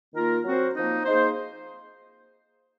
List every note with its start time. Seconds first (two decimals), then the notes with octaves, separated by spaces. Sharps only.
0.14 D#3 A#3 F4 A#4
0.45 F#3 C4 F#4 C5
0.75 F3 A#3 D#4
1.05 A#3 D#4 G#4 C5